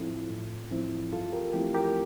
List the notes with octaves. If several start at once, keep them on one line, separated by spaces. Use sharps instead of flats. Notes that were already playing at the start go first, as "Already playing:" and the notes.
Already playing: A2 F3 C4 E4 F4 A4
A2
F3 C4 E4
G2 F4 A4
G4 A#4
F3 A3 C4 E4 G4
G4 A#4